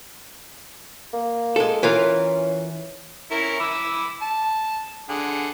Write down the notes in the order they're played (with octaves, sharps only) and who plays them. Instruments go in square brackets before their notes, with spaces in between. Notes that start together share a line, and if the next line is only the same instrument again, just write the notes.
[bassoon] A#3
[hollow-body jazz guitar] G#3 A4
[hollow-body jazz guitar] E3 F4 A#4 [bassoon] C#4
[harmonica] C#4 E4 A#4
B5 D6 E6
A5
D3 G#4 F#5